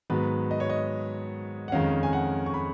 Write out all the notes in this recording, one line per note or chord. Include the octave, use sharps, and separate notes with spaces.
G#2 D#3 F#3 B3 B4
D#5
C#5
D#5
F#5
F2 D#3 G#3 C#4 F5
G#5
F#5
C#6
B5